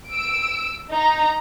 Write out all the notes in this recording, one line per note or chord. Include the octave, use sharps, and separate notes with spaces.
E6 D7
D#4 A#5